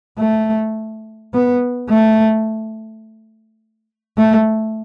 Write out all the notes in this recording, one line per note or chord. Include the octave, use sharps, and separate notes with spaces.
A3
B3
A3
A3